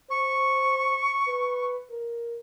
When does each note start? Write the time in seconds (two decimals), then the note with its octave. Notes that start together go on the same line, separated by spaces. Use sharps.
0.10 C5 C#6
1.28 B4
1.90 A#4